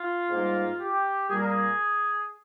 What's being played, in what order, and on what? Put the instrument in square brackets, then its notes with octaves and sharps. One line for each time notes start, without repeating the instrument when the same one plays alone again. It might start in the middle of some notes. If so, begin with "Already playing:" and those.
Already playing: [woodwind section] F4
G#2 G3 A#3
G4
A#2 G3 A#3 G#4
A#4
G#4